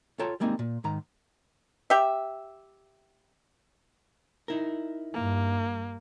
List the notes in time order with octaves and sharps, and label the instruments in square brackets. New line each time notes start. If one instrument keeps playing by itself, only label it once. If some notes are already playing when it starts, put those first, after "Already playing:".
[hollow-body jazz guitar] F4 A4 C#5 G5 A5 A#5
G3 G#3 A#3 C4 D#4 D#5
A#2
G#2 D#3 A#5
[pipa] G4 E5
[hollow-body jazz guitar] D#4 E4 A#4
[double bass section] G2 [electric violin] A#3